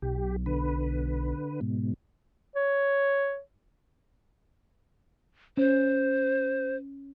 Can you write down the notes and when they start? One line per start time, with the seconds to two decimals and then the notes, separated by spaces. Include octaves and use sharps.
0.02 B1 G4
0.46 D3 B4
1.61 G#2 B2
2.55 C#5
5.57 C#4 C5